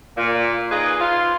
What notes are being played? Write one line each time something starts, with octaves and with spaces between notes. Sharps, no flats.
A#2
D#4 F4 G#4 B4 D#5
F4